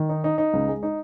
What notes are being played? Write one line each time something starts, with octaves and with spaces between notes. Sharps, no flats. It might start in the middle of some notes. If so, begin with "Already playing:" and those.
Already playing: D#3
D#4
D#4
D#4
C#2
G#3
D#4